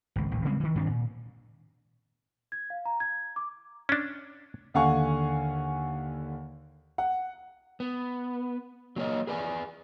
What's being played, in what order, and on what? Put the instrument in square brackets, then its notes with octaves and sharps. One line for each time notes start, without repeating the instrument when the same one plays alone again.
[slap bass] G#1 C#2
A1 D#2
C#3 G3 G#3 C4
D#3 E3
G2 D#3 C4 D4
A#2
[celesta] G#6
F5
A#5
G#6
D6
[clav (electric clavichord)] C#4 D4
[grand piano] D#2 D3 F5 F#5 G#5 C#6
F#5
[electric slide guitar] B3
F#3 A#3 C#5 D#5
G#4 B4 D5 G5 G#5